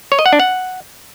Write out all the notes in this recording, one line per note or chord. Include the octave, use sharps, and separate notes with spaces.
C#5
D#5
F#5
D4
F#5